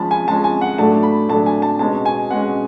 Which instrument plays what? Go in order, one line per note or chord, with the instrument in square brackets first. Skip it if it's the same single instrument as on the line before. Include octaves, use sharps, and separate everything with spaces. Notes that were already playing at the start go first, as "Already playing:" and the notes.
Already playing: [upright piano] F3 G#3 C#4 A5 B5
G#5
F3 G#3 C#4 A5
G#5
F#5
A2 F#3 A3 D4 A5
B5
A2 F#3 A3 D4 A5
G#5
A5
B2 G#3 C#4 A5
G#5
B2 G#3 C#4 F#5